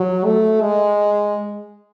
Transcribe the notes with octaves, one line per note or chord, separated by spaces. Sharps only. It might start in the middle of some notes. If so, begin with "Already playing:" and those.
Already playing: F#3
A3
G#3